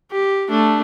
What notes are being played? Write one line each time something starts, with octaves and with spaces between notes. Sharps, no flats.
G4
A3 D4